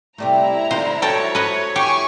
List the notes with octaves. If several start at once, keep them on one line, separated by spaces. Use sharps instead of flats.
C3 G3 A3 E4 A#5
D3 D#4 F4 C5
F#3 A4 C5 C#5 G5 A5
B4 D#5
E4 G4 G#5 C#6